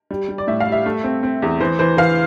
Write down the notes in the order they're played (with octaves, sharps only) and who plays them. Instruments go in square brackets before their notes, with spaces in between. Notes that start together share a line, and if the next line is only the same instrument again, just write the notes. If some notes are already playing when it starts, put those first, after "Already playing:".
[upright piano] G3
G3
D5
A2 E5
F5
G3
E5
A3
C4
C4
E2
E3 C5
E3 C5
E3 F5